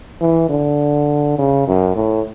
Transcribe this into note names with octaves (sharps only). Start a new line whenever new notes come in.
E3
D3
C#3
F#2
A2